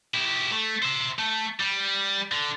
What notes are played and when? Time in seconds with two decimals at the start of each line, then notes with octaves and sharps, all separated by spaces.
0.14 E4 G4
0.52 A3
0.82 C5 E5
1.19 A3
1.60 G3
2.32 D3